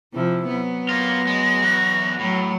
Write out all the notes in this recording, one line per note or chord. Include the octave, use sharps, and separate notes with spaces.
C3 F3 E4
F#3 B3
A#3 F4 A#6
G#3
E2 F#4
A2 F#3